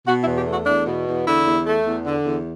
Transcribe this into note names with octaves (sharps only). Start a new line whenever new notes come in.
B2 F#4
E4
E2
G4
A3
F#4
E2 D4
B2
E2
D3 E4
E2
A3
E2
D3
E2